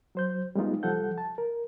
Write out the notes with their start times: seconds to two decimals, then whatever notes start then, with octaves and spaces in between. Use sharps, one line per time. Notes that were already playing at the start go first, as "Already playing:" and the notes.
0.15 F#3 C5 G6
0.55 G3 G#3 B3 D#4 F4
0.83 C2 F3 G3 A4 F#5 G6
1.18 A5
1.38 A#4